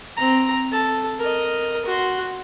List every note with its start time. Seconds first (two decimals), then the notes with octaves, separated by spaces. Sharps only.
0.17 C4 A#5
0.71 A4 A5
1.19 A#4 D#5
1.86 F#4 C6